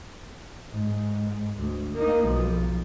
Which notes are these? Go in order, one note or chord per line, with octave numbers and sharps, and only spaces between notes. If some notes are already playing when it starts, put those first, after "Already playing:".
G#2
D2
A#3 D#4
B1 F3